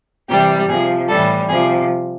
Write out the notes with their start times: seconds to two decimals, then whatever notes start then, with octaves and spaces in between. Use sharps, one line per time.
0.28 C3 E3 G3 G4
0.68 C3 F3 G#4
1.08 A2 E3 G3 A4
1.48 C3 F3 G#4